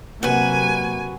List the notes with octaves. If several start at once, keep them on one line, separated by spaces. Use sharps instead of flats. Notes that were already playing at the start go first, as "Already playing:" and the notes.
C3 F#3 A#3 F#4 B4 G#5